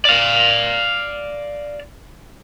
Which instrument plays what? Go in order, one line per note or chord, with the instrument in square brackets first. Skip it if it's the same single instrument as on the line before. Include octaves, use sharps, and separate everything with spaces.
[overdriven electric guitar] D5 F5